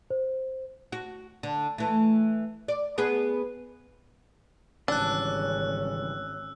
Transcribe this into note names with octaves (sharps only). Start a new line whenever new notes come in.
C5
F#4
D3
E3 A3
D5
B3 G#4 B4
G#1 C#3 E3 G3 C#4 D4 E6 F#6